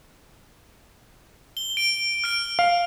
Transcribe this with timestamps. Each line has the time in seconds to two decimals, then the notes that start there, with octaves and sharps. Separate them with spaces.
1.57 G7
1.77 D7
2.24 F6 D7
2.59 F5